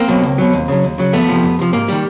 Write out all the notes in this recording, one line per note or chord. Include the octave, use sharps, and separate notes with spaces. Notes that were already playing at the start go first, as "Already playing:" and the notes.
Already playing: A#3 C4
B2 F#3
C#2
B2 F#3
D#2
C#3 F#3
D#2
C#3 F#3
F2 A3 B3
C3 F3
F2
C3 F3
G#2 A#3
D#3 G3